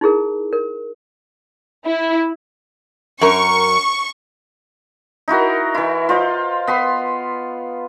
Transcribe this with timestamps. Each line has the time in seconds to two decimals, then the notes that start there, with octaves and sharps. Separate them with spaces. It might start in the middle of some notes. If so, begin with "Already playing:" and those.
0.01 D#4 E4 G#4 A#4
0.52 A#4
1.86 E4
3.21 F#2 A#4 C#6
5.28 D#4 E4 F#4 A#4
5.74 E3 E4
6.09 F4 C5 D#5
6.67 B3 B5 C6